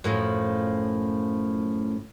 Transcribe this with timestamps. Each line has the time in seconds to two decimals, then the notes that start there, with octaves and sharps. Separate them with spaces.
0.04 F#2 A2 F3